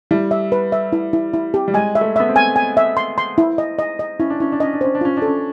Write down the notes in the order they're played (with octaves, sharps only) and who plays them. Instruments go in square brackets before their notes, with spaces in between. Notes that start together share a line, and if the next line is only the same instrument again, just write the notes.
[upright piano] G3 [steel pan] E4
[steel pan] E5
B4
E5
E4
E4
E4
G4
[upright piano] G3
[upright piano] G#3 [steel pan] G#5
[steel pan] E5
[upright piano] A3
[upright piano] B3 [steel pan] E5
[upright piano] C4
[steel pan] G#5
G#5
E5
C6
C6
E4
D#5
D#5
D#5
[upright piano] C#4 [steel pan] E4
[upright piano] D4
[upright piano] C#4 [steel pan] E4
[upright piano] D4
[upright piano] C#4 [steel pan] D#5
[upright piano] D4
[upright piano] C#4 [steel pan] C5
[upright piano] D4
[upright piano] C#4 [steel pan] F4
[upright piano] D4
[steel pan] A4
[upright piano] C#4